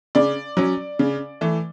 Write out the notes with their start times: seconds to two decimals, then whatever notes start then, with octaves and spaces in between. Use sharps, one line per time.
0.15 C#3 D5
0.57 F#3 C#4
0.99 C#3
1.41 E3 A3